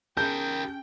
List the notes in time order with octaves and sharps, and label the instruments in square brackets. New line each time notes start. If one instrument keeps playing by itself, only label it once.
[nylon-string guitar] C#4 G#4 A5 [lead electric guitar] G4 A#4 [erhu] G5 [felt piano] G6